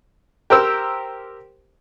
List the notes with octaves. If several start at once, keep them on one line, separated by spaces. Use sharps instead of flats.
G4 A#4 C5 E6